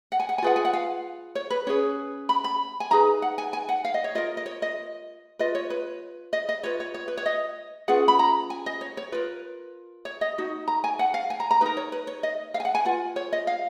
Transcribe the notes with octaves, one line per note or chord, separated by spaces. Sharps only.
F#5
G#5
F#5
G#5
F4 G#4 B4 F#5
G#5
F#5
F5
C#5
B4
C#4 G#4 B4 C#5
B5
B5
G#5
D#4 G#4 B4 A#5
F#5
G#5
G#5
F#5
F5
D#5
C#5
F4 A#4 D#5
D#5
C#5
D#5
F4 B4 D#5
C#5
B4
D#5
D#5
F4 B4 C#5
C#5
C#5
B4
C#5
D#5
C#4 F4 G#4 B4 F#5
B5
A#5
G#5
D#5
C#5
C#5
F4 A#4 B4
C#5
D#5
D#4 F#4
A#5
G#5
F#5
F5
G#5
A#5
A#5
D#4 A#4 B4
C#5
B4
C#5
D#5
F5
G#5
F#5
G#5
F4 B4 F#5
C#5
D#5
F5